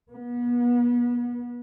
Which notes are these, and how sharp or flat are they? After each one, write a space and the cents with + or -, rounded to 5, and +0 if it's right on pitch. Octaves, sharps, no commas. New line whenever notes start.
B3 -35